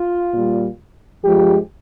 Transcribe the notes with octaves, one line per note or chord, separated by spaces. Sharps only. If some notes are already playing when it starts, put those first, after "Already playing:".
Already playing: F4
A#2 G3
G2 F3 G#3 G4